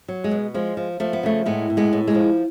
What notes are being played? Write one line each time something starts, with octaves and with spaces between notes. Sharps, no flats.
F#3
G#3
B2
F3 G#3
F3
F3 A3
B3
C#3 A3
A2 G#3 B3
A2
G#3 B3
A2
G#3
F3